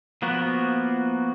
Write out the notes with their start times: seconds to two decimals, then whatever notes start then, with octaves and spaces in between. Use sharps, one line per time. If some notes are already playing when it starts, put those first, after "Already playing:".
0.22 F3 A#3 B3 F#4